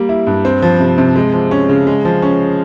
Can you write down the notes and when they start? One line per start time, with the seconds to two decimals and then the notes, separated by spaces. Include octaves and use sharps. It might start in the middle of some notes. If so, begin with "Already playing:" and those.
Already playing: G3 A#3
0.09 E4
0.27 G2
0.45 C4
0.62 F3
0.80 C3
0.98 C3
1.16 G#3
1.34 F3
1.51 C#4
1.69 C#3
1.87 G#3
2.05 F3
2.22 C#4